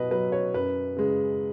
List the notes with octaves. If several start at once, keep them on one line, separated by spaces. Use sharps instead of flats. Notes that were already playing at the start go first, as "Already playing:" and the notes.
Already playing: B2 F#3 B4 D#5
F#3 B4
C#5
F#2 B4
C#3 G#3